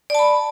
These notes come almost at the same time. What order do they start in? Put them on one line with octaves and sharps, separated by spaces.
D5 A5 B5